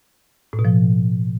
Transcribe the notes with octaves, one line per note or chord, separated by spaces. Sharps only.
A2
B2
F3